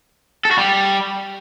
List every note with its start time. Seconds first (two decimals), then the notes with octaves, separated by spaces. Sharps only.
0.45 A4
0.51 F#4
0.57 G3